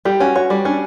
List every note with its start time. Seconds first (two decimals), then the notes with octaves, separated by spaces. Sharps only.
0.05 G3 G4
0.20 C#4 F#4
0.36 F#4 C#5
0.50 G3 G4
0.65 C#4 D4